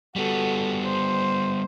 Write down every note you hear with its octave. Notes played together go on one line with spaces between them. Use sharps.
G3 B3 F#4 A4
C5